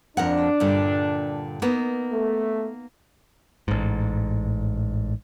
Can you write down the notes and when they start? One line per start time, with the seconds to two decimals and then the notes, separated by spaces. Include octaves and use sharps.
0.17 F2 D4 A#4 F#5
0.60 G2 A#2 D3
1.62 A#3 B3 D#4
2.12 A3
3.68 A1 G#2